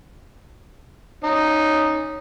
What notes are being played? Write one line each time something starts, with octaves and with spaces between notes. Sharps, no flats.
C#4 D#4